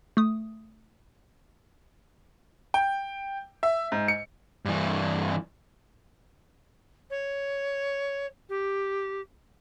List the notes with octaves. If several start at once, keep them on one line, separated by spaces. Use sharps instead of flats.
A3 D#6
G5
E5
G#2
C#7
G2 E3
C#5
G4